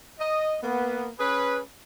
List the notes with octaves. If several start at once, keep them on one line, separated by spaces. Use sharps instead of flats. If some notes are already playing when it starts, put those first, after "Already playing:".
D#5
A#3 B3
C#4 G#4 B4